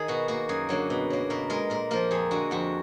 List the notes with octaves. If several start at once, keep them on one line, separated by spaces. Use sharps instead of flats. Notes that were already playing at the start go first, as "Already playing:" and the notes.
Already playing: D#3 G#4
B2 F#4
A#3 F#4
F#2 G#4
D3 F#3 A#3
B2
F#3 A#3
B2 A#4
G#3 A#4
A#2 A#4
F3 A#3 A#4
F2 G#4
D3 G#3 F#4
F2 F#4